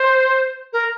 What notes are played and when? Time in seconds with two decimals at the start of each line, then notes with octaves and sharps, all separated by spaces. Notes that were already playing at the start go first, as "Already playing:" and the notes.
Already playing: C5
0.73 A#4